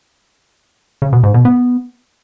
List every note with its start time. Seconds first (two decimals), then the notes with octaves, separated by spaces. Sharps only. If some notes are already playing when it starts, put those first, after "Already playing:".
1.02 C#3
1.13 B2
1.23 G#2
1.34 B2
1.45 B3